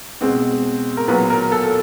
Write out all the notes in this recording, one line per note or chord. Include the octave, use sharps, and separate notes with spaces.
B2 G#3 C4
A#4
A#2 F#3 B3 B4
A#4
A4